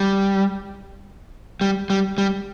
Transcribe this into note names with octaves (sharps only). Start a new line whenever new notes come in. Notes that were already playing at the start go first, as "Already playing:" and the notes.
Already playing: G3
G3
G3
G3